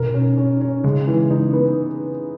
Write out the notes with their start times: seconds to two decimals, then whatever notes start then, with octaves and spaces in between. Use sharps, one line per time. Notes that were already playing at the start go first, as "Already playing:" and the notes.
Already playing: B2 A#4
0.14 C#4
0.37 C#4
0.61 C#4
0.84 C#3 G#3
1.07 E3
1.30 D#4
1.53 B3